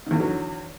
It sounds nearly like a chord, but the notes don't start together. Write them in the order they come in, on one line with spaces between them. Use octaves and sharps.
D#3 E2 D3 F#3